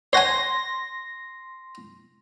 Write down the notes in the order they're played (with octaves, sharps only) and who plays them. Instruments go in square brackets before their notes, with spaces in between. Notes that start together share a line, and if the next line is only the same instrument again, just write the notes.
[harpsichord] C#5 F#5 G#5 [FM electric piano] C6 A#6